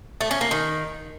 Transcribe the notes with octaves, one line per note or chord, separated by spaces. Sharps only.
A3
C#4
A#3
D#3